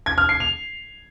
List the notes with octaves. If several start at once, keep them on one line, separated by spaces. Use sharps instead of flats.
G#6
F6
C7
F7